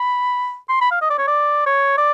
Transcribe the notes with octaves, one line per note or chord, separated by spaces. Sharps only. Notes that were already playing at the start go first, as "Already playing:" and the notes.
Already playing: B5
C6
B5
F5
D#5
D5
C#5
D5
C#5
D5